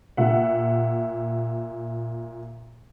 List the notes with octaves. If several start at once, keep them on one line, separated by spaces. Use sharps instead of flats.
A#2 G4 E5 F#5